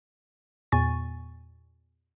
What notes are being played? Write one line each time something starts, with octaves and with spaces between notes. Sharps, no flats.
E2 A#2 G#5 C#6 A6